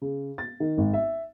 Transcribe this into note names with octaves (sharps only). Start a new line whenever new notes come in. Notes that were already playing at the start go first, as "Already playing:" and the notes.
C#3
A6
D#3
G#1
E5